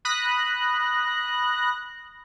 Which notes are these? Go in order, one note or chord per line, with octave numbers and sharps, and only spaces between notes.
B5 D#6 F#6 A#6